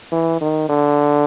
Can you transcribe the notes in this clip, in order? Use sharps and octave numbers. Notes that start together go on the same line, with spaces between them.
E3
D#3
D3